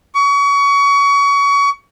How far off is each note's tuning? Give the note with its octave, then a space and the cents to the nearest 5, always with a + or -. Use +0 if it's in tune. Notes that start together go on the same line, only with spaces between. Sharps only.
C#6 +30